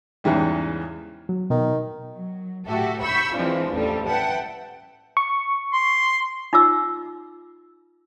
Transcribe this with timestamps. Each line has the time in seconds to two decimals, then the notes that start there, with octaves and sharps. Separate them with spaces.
0.24 E2 G#2 C#3 E3 G3
1.29 F#3
1.50 B2 D#3
2.13 F#3
2.66 A2 F#4 G4 A4 E5
3.01 B5 C#6 E6 G6 B6
3.34 E3 F3 G#3 C4 D4 F4
3.72 A1 E2 F3 G3 A4
4.07 B4 E5 F#5 G5 A5
5.17 C#6
5.73 C6
6.53 D#4 F4 D6 E6